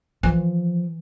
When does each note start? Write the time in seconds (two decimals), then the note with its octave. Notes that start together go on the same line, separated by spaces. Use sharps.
0.23 E3 F3